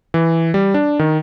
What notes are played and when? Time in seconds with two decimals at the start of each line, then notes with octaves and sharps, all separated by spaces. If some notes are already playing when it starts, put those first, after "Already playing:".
0.14 E3
0.54 G3
0.74 D4
0.99 D#3